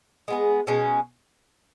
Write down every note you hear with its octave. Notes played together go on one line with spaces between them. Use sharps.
G#3 B3 G#4
B2 G#3 C#4